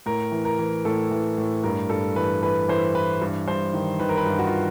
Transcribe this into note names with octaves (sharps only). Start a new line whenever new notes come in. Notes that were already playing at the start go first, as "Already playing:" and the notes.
A2 A#4
E3
A#4
E3
A2 A4
E3
A2
G2 A#4
G2 A4
E3 B4
E3 B4
E3 C5
E3 B4
G2
G2 C5
D#3
D#3 B4
A#4
B4
G2
F#4
F4